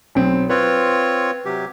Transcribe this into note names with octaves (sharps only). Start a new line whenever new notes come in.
B1 C4
C4 F4 B4 C#5
C3 F#3 G4